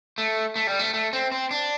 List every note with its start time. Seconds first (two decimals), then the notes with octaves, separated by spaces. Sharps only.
0.18 A3
0.56 A3
0.67 G3
0.79 A3
0.94 A3
1.13 C4
1.32 C4
1.51 D4